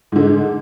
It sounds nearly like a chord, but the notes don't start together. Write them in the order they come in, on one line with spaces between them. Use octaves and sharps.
G#2 D3 G#3